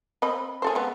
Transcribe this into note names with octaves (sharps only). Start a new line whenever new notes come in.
C4 D#5 B5
G#4 A4 C5
G#3 B3